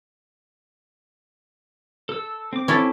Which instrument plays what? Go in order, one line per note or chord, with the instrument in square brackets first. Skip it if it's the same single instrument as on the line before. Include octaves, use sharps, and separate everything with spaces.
[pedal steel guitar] A4 E6
C4 D6
[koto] C#4 E4 A4